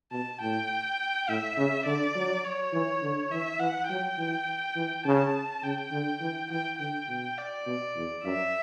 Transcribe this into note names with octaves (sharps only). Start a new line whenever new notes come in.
B2 A5
A2 G5
A2 E5
C#3
D3 D5
F#3
C#5
E3
D3
E3 E5
E3 F#5
F#3 G5
E3
E3
C#3 A5
C#3 G5
D3
E3
E3 G5
D3 G5
B2
D5
B2
E2
F#2 E5